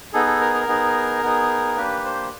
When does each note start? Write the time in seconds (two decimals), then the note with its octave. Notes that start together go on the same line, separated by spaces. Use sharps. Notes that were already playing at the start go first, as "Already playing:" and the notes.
0.13 B3 D#4 G#4 A4
0.26 A4
0.40 A#4
0.54 A#4
0.67 B3 D#4 G#4
1.23 B3 D#4 G#4
1.77 A#3 D4 G4 B4
2.04 C5